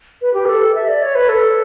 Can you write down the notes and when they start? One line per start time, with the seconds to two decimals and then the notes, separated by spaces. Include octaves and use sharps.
0.22 B4
0.34 G4
0.45 B4
0.49 A4
0.75 E5
0.88 D5
1.02 C#5
1.15 B4
1.29 A4